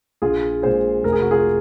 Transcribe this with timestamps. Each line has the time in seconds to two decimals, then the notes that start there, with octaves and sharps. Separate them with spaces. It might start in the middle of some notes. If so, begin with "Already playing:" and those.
0.22 A#1 F4 G#4
0.62 A#2 G#3 G#4 C5
1.03 F1 A#4
1.12 G#4
1.22 F#4
1.31 F4 G#4